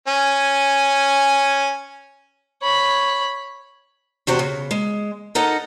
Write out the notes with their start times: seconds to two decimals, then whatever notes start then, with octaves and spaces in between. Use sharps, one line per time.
0.08 C#4 G#5
2.62 C#5 B5
4.27 E2 C3 F#4 G4 C5 F#5
4.39 C#3
4.71 G#3
5.35 D#4 A4 A#4 D#5 F#5